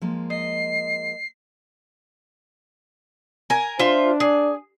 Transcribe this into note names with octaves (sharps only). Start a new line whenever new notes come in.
F3 G#3 A#3
D#5 C7
A#4 G#5
D4 F4 C5 E5
G#4 D5